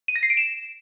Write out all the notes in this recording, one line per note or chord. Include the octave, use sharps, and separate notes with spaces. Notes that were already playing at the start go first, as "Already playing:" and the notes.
D#7
A#6
C7
D7
E7